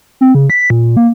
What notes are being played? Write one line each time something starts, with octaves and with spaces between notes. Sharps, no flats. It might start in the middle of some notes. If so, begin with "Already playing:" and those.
C4
C#3
B6
A#2
A#3